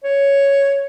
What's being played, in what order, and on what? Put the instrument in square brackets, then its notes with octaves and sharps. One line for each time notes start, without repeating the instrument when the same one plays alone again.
[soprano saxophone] C#5